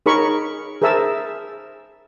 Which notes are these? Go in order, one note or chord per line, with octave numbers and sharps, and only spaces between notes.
D#4 G#4 A#4 C#5 B5 C#6
G#4 A#4 C5 E5 A5 E6